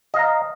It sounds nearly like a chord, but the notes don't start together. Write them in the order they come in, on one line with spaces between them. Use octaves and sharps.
D#5 F5 A#5